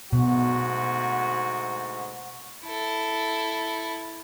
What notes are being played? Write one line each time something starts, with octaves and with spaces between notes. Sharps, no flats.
D2 G#2 B2 F#4
E4 A4